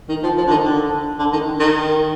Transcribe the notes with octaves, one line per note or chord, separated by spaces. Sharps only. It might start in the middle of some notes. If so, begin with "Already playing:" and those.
D#3
F3
F3
D3
D#3
D3
D3
D#3
D#3